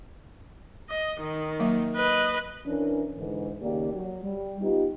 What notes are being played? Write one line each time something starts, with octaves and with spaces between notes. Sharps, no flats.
D#5
D#3
F#3 A#3 E5
B4 D#5
E3 C#4 D4 A#4
G#2 D3 E3
D#2 C#3 A#3 G4 D5
F#3
G3
B3 D#4 F4 G4